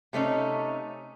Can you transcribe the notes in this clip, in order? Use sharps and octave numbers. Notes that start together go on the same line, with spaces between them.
C3 A3 C#4 D#4